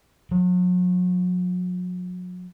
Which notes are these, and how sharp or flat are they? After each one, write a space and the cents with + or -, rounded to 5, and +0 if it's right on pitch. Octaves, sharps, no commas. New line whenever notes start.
F#3 -40